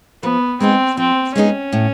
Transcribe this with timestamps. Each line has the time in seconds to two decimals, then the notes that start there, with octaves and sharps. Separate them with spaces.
0.23 F3 B3
0.61 G#3 B3 C4 D#4 G#4
0.97 F3 C4
1.35 G#3 B3 C#4 D#4 G#4
1.73 A2